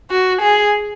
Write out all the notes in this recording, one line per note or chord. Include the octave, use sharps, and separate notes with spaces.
F#4
G#4